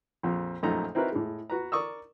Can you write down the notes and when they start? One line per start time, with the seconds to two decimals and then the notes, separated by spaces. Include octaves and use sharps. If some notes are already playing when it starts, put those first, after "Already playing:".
0.23 A#1 F2
0.63 A#1 F#2 A3 D#4 A4 A#5
0.95 C4 D#4 E4 F#4 A#4 B4
1.12 A2 G#3
1.50 F#4 B4 A#5
1.72 A#4 D5 C#6 D#6 E6